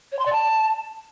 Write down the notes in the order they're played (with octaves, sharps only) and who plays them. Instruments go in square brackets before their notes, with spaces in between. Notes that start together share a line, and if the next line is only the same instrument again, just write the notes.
[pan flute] C#5
C6
D5
A5